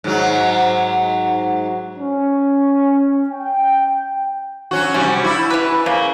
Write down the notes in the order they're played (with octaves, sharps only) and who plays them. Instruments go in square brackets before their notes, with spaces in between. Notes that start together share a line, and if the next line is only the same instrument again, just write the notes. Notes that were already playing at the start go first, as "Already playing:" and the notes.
[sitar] G#2 F#3
[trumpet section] C#4
G5
[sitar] F#3 C#4 F#4
[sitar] C3 G3 F#4 [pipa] C#4
[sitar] E4
[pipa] E3 B4
[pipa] C#3 [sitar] A#3